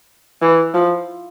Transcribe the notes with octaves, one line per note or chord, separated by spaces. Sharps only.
E3
F3